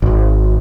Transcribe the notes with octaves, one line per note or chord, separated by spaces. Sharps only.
G#1